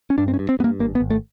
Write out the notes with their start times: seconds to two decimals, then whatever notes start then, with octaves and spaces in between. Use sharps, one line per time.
0.10 C#4
0.18 G2 D4
0.28 C4
0.34 C#4
0.39 G2
0.49 C4
0.59 G2 B3
0.64 A#3
0.79 G#1 A#3
0.95 B3
1.00 G#1
1.10 A3